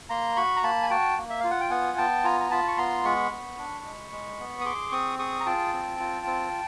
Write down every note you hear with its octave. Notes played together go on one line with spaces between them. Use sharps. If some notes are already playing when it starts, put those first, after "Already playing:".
A#3 A#5 C6
F#4 B5 C#6
A#5
A#3 A5 B5
G#5
F#4 G5 A5
A#3
E5
F4 F5
F#5
G5
B3 F#5 G#5
B3 G5 A5
F4 G#5 A#5
A#5
F4 A5 B5
C#6
B3 A#5 C6
G#3 B5 C#6
B3
D4
G#3
G#3
B3
D#6
G#4 C6 D6
C4 C#6 D#6
G#4 C#6 D#6
A#5
F4 G5 A5
C4
F4
C4